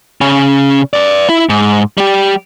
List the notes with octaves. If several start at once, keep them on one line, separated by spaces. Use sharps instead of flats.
C#3 C#4
B4 D5
E4
G#2
G3 G4